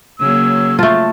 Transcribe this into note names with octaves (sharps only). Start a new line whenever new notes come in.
C#3 F#3 A#3 E6
A3 F4 A5